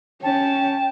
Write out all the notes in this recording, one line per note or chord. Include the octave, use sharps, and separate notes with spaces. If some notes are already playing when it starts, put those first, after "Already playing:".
C#4 G5 A5